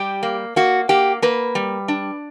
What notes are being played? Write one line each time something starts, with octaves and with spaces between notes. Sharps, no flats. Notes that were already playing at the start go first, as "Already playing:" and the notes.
Already playing: G3 G4
A#3
A#3 F#4
A#3 G4
A#3 B4
G3
D4